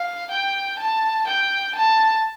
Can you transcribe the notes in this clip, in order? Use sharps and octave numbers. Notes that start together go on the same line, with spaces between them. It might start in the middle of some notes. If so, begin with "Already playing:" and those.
Already playing: F5
G5
A5
G5
A5